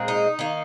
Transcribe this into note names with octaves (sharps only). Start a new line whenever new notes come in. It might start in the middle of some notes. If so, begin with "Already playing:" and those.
Already playing: A#2 G#3 C4
D#4
D#3 A#3